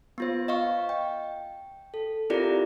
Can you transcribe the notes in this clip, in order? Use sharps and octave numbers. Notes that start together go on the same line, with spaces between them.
B3 F4 C5
D#5 F5 C#6
G5
A4
C4 E4 F4 G4 A#4 D5